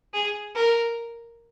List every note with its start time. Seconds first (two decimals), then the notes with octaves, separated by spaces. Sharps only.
0.14 G#4
0.55 A#4